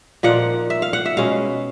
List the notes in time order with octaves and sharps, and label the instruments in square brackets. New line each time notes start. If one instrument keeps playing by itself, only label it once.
[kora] A#2 F3 A#3 D#4 F#5
E5
F5
F#5
E5
B2 G#3 C#4 F5